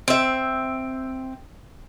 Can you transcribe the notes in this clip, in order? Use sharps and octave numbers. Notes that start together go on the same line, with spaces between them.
C4 E5